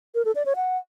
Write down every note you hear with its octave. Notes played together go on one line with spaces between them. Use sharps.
A#4
A4
D5
C#5
F#5